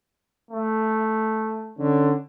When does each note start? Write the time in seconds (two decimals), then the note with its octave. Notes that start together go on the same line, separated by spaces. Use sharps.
0.51 A3
1.78 D3 C#4